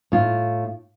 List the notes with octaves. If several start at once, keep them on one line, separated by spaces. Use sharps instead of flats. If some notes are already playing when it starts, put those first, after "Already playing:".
A2 F4